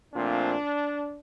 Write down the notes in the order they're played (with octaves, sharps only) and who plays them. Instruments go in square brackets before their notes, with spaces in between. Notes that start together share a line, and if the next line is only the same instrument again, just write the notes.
[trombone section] A#2 F3 A3 C4 D4